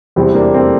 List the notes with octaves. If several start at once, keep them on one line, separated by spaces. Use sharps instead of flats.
E2 C3 G3 C4 E4
A#3 D4
A3 C4